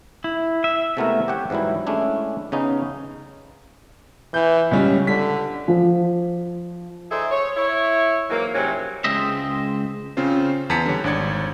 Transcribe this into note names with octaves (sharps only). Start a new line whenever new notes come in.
E4
E5
C3 G#3 A3 B3 E4 A#4
G4 C#5 F#5 G5
G#2 E3 F#3 G3 E4
G#3 A3 C#4 D4 E4
C#3 B3 C#4 D#4
E3 G6
C#2 G3 C#4
D3 B6
F3
D#4 G#4 A4 C5 D5 E5
C#5
E4 C#5
G#2 E3 F#3 A#3
G#2 C3 F#3 G3 C#4
C#2 G#3 C4 D#5 E5
C#3 C4 C#4 F4 C5
E2 B4 A5 B6 C#7
D3 G3 C#5
G#1 D4 C#5 D5 G#6 C#7